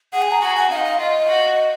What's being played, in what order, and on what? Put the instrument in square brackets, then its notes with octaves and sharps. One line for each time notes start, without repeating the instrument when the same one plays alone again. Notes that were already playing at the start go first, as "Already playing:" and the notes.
[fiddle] G#4 [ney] F#5
[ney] G#5
A#5
[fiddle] F#4 [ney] G#5
[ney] F#5
[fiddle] D#4 [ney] F5
[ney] F5
[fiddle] F4 [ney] D#5
[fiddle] F#4